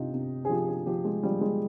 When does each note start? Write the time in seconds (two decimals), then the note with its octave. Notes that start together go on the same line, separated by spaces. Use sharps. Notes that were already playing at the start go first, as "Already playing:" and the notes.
Already playing: C3 D#4 F4
0.14 C3
0.45 G#4
0.50 F3 G4
0.68 G#4
0.86 F3 G4
1.05 G#3
1.23 F3 G3
1.41 G#3